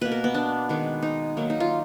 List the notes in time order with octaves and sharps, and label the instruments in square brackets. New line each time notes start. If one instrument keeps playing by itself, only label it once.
[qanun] B2 A#3 B4
A#4
B3
D4
D#3 G#3 B3
D#4
D#3 F#3 A#3
D#4
F4